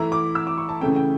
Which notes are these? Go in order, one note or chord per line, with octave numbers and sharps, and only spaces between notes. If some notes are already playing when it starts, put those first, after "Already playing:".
Already playing: E3 A3 E4 A#5
D6
E6
D6
C#6
A5
C#3 E3 A3 C#4 G5
G5